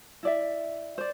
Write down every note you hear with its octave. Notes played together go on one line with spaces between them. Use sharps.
E4 D5 E5
C5 D5